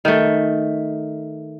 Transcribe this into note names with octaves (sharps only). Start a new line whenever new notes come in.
D#3 A3